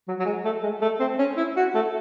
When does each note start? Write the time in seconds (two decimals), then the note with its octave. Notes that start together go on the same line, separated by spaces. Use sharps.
0.08 F#3
0.19 F#3
0.26 G#3
0.45 A3
0.63 G#3
0.81 A3
1.00 C4
1.19 C#4
1.37 E4
1.57 F#4
1.75 A3